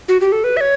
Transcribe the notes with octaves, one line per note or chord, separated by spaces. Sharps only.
F#4
G4
A4
B4
E5
C#5